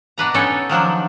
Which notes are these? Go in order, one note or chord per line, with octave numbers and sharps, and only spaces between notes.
B2 D4 B4 A#5
B3 C#4 D#4 A4 C#5 G5
D#3 F3 F#3 D4